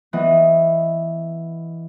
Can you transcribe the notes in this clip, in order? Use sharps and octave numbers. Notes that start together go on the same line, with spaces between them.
E3 B3 D#5